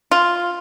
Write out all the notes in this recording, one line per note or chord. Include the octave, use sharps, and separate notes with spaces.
F4